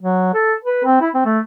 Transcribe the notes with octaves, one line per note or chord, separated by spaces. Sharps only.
F#3
A4
B4
C4
E4
C4
A3